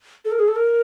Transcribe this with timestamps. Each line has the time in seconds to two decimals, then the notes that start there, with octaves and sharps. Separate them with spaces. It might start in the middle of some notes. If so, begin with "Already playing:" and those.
0.25 A4
0.32 A#4
0.39 G#4
0.48 A4
0.56 A#4